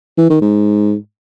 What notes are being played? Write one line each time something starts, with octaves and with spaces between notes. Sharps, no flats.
E3
D#3
G#2